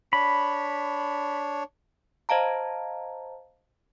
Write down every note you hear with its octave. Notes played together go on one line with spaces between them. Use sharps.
D4 C#5 B5
C5 D#5 F5 A5 A#5